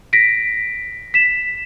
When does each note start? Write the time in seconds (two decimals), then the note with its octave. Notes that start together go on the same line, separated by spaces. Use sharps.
0.13 A#6 B6 D7
1.14 B6 E7